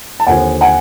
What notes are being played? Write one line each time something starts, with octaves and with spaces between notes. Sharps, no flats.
A5
D#2 D3 F3 F#5 G#5
F#5 G#5